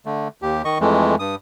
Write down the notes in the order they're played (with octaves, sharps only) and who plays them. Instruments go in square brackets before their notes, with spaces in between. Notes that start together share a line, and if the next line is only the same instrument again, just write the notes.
[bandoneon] D3 A3
D#2 G4
D#3 D#5 C#6
F2 E3 G#3 A3
G2 D#6